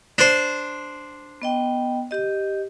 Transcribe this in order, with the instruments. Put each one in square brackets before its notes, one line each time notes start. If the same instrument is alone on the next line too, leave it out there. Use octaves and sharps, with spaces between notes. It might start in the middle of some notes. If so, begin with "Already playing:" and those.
[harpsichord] D4 C5
[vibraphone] B3 D#5 G5
G4 D#5